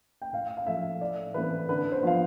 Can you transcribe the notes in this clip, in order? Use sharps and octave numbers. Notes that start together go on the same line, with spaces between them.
G5
A2 F5
F5
F3 A3 E5
A2 D5
E3 A3 C4 B4
D3 B4
C5
F3 B3 F4 F5